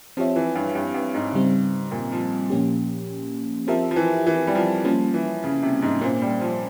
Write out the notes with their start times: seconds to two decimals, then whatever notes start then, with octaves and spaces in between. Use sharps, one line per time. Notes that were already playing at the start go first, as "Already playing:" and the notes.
0.17 F3 C4 G4 C#5 E5
0.36 E3
0.55 G2
0.75 G2
0.94 G2
1.14 G#2
1.33 C#3 G3 C4
1.92 A#2
2.12 F3
2.50 A#2 F3 A#3 C#4 G4
3.67 F3 C4 G4 A#4 E5
3.91 F3
3.96 E3
4.27 E3
4.47 G3
4.55 F3
4.84 F3 G3 A#3 C#4
5.14 E3
5.44 C#3
5.63 C3
5.82 G#2
6.01 A#2 A#3 C#4 F4 C5
6.22 G3
6.41 F3